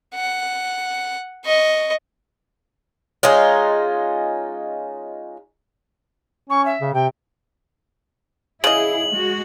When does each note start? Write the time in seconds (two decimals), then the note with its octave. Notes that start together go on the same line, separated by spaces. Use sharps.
0.15 F#5
1.45 D#5 C#6
3.23 G#3 C#4 D#4 F4
6.50 C#4 C#6
6.65 E5
6.81 C#3
6.94 C3 G5
8.64 C#3 E4 G#4 D#5 F#7
9.09 G#3 F#4